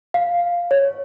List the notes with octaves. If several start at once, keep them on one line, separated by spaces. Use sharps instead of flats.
F5
C#5